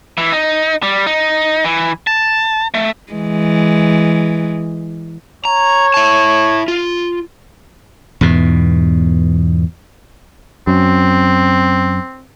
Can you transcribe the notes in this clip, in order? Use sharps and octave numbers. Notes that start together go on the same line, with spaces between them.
E3
D#4
G3
D#4
E3
A5
A3
E3 G#3
C#5 A#5
E4 A5
F4
E2 G#2 B2
F#2 C4